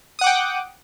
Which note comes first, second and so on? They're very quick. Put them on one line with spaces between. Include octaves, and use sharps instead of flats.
D#6 F#5 D6 G5